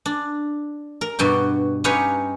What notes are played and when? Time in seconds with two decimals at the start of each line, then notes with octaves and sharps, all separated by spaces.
0.06 D4
1.01 A#4
1.19 G2 B2 F#4 G5
1.84 C#4 D#4 G4 B4 C#5 F5